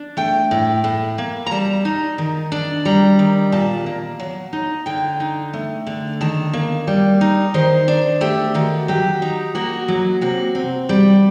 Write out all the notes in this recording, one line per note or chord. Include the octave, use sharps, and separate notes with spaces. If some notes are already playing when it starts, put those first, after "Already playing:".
Already playing: D4
A3 G5
A2
A2
A#3
A#5
G3 A5
D#4
D#3
D4
G3 A#5
D#3
A#2 A5
A#3
F#3
D#4
D3 G5
D#4
A3
D3
D#3 A5
A#3
G3
D#4
D#3 C5
D4
A3 G4
D#3 F#4
F#3 G4
D#4
A#3 F#4
F#3
C3 F#4
C4
G3